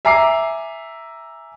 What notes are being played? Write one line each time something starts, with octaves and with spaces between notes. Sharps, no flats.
E5 G#5 A#5 D6 C7